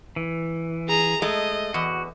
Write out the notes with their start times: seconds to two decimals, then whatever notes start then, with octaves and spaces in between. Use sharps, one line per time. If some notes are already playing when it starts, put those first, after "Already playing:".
0.16 E3
0.89 G#4 A#5
1.22 G#3 A3 D#5
1.74 E2 F#4